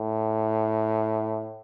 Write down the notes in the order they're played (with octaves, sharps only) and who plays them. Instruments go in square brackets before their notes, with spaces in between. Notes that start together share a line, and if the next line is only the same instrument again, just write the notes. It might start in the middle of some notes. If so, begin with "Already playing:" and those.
Already playing: [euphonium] A2